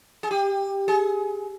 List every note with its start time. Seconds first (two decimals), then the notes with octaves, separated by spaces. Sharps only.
0.23 G#4
0.31 G4
0.88 G#4